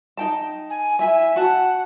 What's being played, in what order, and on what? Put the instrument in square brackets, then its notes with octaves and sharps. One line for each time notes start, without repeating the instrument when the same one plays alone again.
[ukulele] D#4 G5 A5
[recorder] G#5
[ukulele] E4 G#5 [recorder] E5
[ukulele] F#4 A5 [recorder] F#5